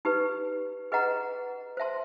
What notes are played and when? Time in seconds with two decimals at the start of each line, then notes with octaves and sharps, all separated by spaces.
0.05 D#4 G4 B4
0.92 G#4 B4 D#5 F#5 A#5
1.77 C5 E5 A5 C6